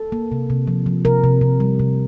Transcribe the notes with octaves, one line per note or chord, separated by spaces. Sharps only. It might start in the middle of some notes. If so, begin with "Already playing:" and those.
Already playing: A4
A#3
C3
C3
F3
F3
C3 A#4
C3
C3
G3
C3